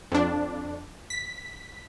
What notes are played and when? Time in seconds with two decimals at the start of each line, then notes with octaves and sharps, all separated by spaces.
0.12 F2 D4
1.10 B6